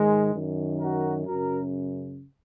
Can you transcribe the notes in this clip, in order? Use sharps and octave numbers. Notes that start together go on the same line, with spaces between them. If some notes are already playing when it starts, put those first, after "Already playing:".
Already playing: G#2 D#3 G#3
F#2 D#3
F#4 A#4
F#2 C#3 F#4 A#4